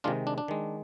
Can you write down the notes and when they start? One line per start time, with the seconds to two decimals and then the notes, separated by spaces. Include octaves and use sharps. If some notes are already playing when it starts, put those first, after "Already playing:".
0.04 C3 D#3 G#3 D4 F4
0.27 D4
0.38 D4
0.48 D#3 G#3